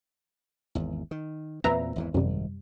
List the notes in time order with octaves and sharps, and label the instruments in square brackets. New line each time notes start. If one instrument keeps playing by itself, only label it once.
[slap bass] G#1 E2
D#3
[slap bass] E2 A#2 C4 [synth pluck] B4 E5 A#5
[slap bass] G#1 E2 E3
[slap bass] G#1 [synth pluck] F#2 C3 G3